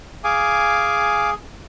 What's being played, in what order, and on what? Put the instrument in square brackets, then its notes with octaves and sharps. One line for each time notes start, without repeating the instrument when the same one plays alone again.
[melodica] G#4 [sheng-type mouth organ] F5 G#5 D6